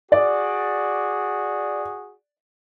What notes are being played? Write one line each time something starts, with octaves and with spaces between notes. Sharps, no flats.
F#4 G#4 D5